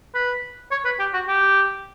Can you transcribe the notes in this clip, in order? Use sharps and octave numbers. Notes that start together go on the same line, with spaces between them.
B4
C#5
B4
G4
F#4
G4